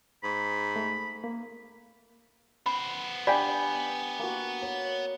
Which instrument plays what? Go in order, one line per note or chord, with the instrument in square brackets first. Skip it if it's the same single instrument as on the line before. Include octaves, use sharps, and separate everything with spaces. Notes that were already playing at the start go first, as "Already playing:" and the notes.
[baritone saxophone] G#2 [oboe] B5
[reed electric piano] A3
A#3
[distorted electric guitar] B3 C5 [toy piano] B5
[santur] D4 G4 [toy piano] D5 F5 [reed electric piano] G5 G#5 B5
[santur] A#3 F#4
C#5